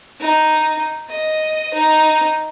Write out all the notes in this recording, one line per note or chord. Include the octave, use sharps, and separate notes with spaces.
D#4
D#5
D#4